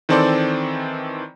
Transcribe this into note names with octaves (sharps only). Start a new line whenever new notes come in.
D#3 E3 C4 A4 C5 D5